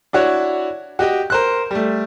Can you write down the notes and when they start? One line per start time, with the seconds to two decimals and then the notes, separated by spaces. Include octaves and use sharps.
0.13 D4 E4 F#4 C#5
0.99 F#4 G4 D#5 G5
1.30 A#4 C5 F#6
1.71 G3 A3